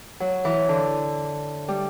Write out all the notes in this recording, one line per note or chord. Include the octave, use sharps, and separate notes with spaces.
F#3
E3
D3
G3